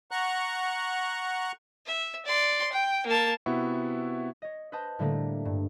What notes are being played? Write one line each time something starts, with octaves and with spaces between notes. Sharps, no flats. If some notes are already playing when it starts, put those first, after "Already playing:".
F#5 A#5 C#6 F#6
E5
D5 C6
G5
A#3 A5
C3 B3 E4 F#4 E5 C#6
C#5 D#5
B4 C5 D#5 A5 G6
A2 D3 G3 A3 A#3 A4
G2